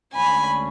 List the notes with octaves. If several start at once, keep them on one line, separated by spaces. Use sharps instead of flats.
D2 D3 G#3 C#4 G#5 B5